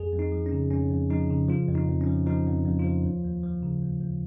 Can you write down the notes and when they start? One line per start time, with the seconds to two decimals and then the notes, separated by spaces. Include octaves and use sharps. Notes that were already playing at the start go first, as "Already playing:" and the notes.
Already playing: F2 G#4
0.13 F2
0.19 D#4
0.32 F3
0.46 C#4
0.52 C#3
0.71 F2 C#4
0.91 F2
1.10 F3 D#4
1.30 C#3
1.48 F3 F4
1.68 F2
1.75 D#4
1.88 F2
2.01 C#4
2.07 F3
2.27 F3 D#4
2.47 F2
2.65 F2
2.79 F4
2.84 F3
3.04 D#2
3.24 D#2
3.43 F3
3.63 C#3
3.83 D#2
4.01 D#2